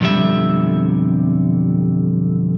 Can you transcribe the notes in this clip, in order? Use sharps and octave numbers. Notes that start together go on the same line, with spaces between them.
B1 F2 D3 G3 E5